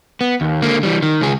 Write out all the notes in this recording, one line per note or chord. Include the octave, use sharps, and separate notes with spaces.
B3
D#2
D3 A#3
E3 G3
D#3
C#2 G#4